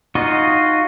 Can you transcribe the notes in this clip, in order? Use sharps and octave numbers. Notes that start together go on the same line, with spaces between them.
D#4 F4 F#4 D#5